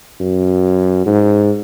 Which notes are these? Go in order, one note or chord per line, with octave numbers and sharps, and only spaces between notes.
F#2
G#2